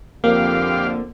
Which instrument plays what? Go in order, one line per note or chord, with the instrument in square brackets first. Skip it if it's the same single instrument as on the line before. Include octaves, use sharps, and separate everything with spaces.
[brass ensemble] F2 D3 [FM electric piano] A#3 [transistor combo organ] G4 F5